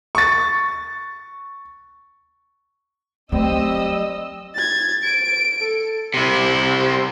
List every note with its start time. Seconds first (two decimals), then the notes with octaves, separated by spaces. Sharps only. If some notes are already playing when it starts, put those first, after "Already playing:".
0.15 C#6 A6
3.32 F#3 G3 A3 C4 D#5 E6
4.55 G#6 A6
5.04 D7
5.61 A4
6.14 C3 E4